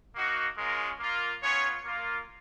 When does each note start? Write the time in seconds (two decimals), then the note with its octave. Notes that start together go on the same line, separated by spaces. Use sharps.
0.15 A#3 D#4 F#4
0.58 G#3 C#4 F4 A#4
1.00 A#3 F4
1.43 B3 C#4 F4 C#5
1.85 A#3 F4